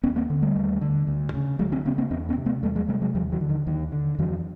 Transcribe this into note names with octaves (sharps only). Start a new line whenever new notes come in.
D#2 B3 C#4
A#3 C4
D3
G3 A3
D#2
D3
D2
C#3
D2 F#3 G#3
C4 D4
C#3 B3 C#4
A#3 C4
E2 C4 D4
B3 C#4
C3
A3 B3
E2 G3 A3
F#3 G#3
C3 G3 A3
F#3 G#3
D#2 F3 G3
E3 F#3
D3
D#3
D#2 D#3
D3
F2 E3 F#3